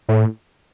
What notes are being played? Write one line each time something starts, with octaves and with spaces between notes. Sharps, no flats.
A2